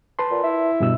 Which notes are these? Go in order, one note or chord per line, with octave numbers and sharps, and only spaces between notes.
B4 A5 C6
A#2
E4
G2 B2 E6